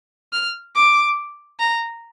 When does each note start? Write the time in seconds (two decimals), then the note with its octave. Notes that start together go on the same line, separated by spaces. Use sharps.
0.33 F6
0.75 D6
1.60 A#5